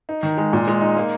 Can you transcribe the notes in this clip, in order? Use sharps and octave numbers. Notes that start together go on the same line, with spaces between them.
D#4
D#3
G#3
A#2
G#3
D#4
A#3